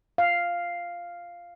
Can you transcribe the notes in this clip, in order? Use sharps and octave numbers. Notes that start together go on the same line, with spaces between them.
F5